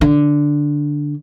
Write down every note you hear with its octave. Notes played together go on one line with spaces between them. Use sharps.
D3